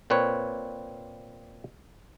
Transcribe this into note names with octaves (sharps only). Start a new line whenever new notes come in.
A#2 C4 B4 C#5